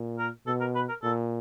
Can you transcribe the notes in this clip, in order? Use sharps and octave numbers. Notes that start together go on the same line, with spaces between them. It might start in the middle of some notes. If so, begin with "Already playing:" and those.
Already playing: A#2
A#4
B2 A4
A#4
B4
A#4
A#2 A4